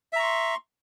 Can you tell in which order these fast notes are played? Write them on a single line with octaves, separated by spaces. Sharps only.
E5 A#5 C#6 C6